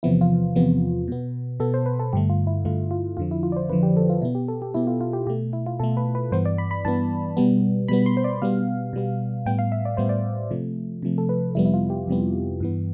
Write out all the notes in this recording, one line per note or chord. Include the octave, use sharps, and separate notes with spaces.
E2 C3 F3 B3 E4
F4
E2 C3 F3 B3
B2 B3
B2 B3 A4
C5
B4
A4
G2 D3 A3 G4
F4
E4
G2 D3 A3 F4
F4
F2 D3 F3 F4
E4
F4
D5
C5
F2 D3 F3 B4
G4
A4
F4
B2 B3 E4
G4
A4
G4
B2 B3 E4
F4
F4
G4
B2 A3 G4
E4
F4
B2 A3 A4
B4
B4
G2 E3 B3 C5
D5
B5
B5
G2 E3 B3 A5
B2 G3 B3
B2 G3 B3 B5
C6
C5
D5
B2 G3 B3 F5
B2 G3 B3
A2 G3 B3 G5
F5
E5
D5
A2 G3 B3 C5
D5
C3 F3 A3
C3 F3 A3
A4
B4
F2 C3 G3 B3 E4
E4
F4
G4
F2 C3 G3 B3
G2 E3 B3